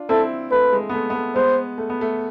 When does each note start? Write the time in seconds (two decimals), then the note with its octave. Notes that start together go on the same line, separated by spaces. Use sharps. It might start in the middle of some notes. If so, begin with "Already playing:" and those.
Already playing: D4 F4
0.09 C4 E4 A4
0.52 A3 B4
0.73 G#3
0.90 B3
0.94 A3
1.10 B3
1.15 A3
1.36 G#3 B3 C5
1.78 A3
1.90 B3
2.01 A3